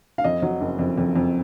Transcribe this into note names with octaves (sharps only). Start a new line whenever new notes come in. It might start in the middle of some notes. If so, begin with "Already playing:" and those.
F5
F2 D#5
F#3
F#1
F2
F2
F2